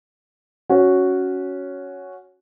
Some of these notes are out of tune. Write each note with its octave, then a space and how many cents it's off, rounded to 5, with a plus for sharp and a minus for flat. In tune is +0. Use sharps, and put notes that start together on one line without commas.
C#4 +5 F#4 +0